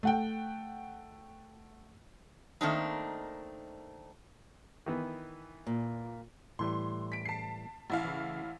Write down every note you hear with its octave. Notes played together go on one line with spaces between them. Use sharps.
A3 F#5 G5
D#3 A3 A#3 C4 D4 D#4
D#3 E3 B3
A#2
A2 E3 G3 C6
B6 D7
A5 C7
A1 E4 F5
C#3 E3